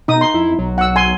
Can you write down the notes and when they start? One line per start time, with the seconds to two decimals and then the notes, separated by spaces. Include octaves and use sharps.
0.08 B2 D#4 D#6
0.21 C6
0.34 F2 E4
0.59 B1 F#3
0.78 F#5 E6
0.96 G#5 C6